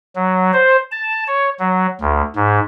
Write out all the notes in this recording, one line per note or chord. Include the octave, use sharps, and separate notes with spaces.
F#3
C5
A5
C#5
F#3
D2
G#2